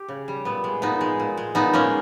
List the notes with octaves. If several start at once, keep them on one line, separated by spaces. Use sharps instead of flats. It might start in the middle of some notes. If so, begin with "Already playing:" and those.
Already playing: G4
C#3
G3
A#2 B3
G#3
A#2 B3 D#4
G#3
A#2
G#3
A#2 B3 D#4
G#3 A#3 C#4